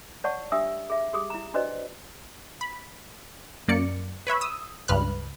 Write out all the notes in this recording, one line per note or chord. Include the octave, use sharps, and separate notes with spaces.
C#5 D5 F#5 A5 C#6
D4 G4 E5 D#6 E6
G#4 E5
G4 G#4 D#6
E4 A#5
D4 F#4 B4 C5 D5 D#5
B5
F#2 A#3 D5 C#7
B4 C#5 E5 B5
D#6 E6
C#2 G2 B4 F6 F#6